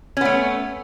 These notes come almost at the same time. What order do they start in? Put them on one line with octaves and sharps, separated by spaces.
C#4 B3 A3